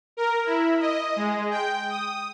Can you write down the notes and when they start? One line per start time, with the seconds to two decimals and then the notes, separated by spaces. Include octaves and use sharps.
0.17 A#4
0.46 E4
0.80 D#5
1.16 G#3
1.51 G5
1.89 D#6